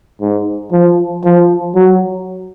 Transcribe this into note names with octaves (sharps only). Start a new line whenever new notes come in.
G#2
F3
F3
F#3